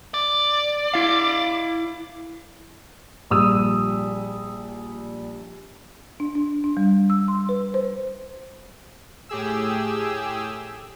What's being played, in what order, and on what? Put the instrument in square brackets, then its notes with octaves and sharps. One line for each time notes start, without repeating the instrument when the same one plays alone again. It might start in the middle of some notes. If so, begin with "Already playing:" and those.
[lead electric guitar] D5
[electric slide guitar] E4 F5
[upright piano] A#1 G3 D#6 E6
[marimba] D4
D4
D4
G3
E6
C6
B4
C5
[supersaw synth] A2 G4 G#4 E6